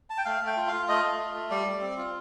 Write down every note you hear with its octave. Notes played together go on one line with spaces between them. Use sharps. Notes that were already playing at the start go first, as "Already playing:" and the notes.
A5
G5
A3 F5
A3
G5
F4
F5
F4
A3 D#5
A3
F4
A3
G3 D5
G3
C4
F4